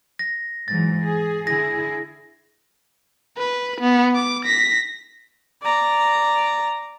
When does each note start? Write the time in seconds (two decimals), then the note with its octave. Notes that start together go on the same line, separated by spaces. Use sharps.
0.19 A#6
0.68 G#2 E3 F#3 A6
1.02 G#4
1.47 D3 E4 G#4 A#6
3.37 B4
3.81 B3
4.15 D6
4.45 A#6 B6
5.62 D5 A#5